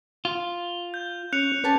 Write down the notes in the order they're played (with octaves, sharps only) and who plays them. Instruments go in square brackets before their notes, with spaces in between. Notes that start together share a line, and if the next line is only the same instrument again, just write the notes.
[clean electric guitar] F4
[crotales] G6
[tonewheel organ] C#4 [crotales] F#6 C#7 F7
[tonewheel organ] C#4 B4 [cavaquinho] G4 A4 G#5